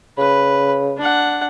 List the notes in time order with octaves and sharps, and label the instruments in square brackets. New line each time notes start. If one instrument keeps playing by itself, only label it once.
[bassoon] C#3 [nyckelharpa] B4
[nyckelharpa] D4 F#5